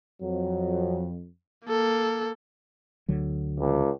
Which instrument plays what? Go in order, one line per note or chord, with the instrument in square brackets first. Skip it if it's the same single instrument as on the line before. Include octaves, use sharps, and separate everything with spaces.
[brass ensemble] F2 [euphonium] F#3
[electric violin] A#3 A4
[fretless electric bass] D2 D3 F#3
[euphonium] C#2